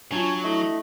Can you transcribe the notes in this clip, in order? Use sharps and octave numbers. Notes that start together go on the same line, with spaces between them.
F#3 D4 F4 C#5 G#5 A5
A3 E4 D#5